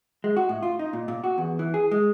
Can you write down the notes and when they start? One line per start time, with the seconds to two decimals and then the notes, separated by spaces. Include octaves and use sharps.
0.24 G#3
0.37 F#4
0.49 A2
0.63 F4
0.79 D#4
0.93 A#2
1.08 A#2
1.24 F#4
1.38 E2
1.59 E3
1.74 G#4
1.91 G#3